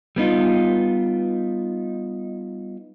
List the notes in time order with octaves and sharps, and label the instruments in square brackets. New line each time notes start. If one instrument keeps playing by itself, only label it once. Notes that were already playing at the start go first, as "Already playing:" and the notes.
[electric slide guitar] G3 B3 D#4 F4